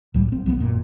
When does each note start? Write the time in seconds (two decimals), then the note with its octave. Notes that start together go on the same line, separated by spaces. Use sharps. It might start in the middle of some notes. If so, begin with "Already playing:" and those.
0.14 C#2 A2 F#3 G3
0.32 G#1 C4
0.46 B1 F#3 A#3 B3
0.60 G#1 F#2 A#2